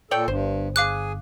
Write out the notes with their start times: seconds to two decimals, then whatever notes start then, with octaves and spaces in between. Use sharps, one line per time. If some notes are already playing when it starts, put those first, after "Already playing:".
0.11 A#2 A4 C#5 D5 G5
0.28 G1 G2 C5
0.76 G#4 F5 G#5 D6 F#6